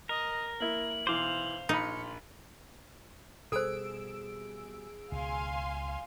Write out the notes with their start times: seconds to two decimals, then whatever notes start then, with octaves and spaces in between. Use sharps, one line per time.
0.09 A#4 D#5
0.60 A#3 E4 F#7
1.07 B1 E3 C5 F5 D6
1.69 A#1 D#4 B5 C#7
3.52 B2 G3 G#4 A4 C5 E6 D7
5.12 C#2 B2 F5 G#5 C6